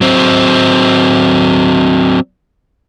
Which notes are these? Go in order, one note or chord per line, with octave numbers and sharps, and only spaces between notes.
F#3 C4